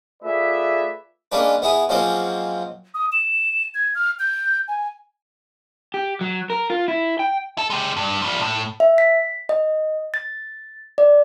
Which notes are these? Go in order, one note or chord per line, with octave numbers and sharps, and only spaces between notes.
A3 F4 G#4 B4 D5 E5
G#3 A#3 C#4 D4 B4
B3 E4 G#4
F3 F#3 G#3 A#3 C4 C#4
D#6
E7
G#6
F6
G6
G#5
G4
F#3
A#4
F4
E4
G5
A4
G#3 G4
G2
F3 G3
A2
E5
B6
D#5
A6
D5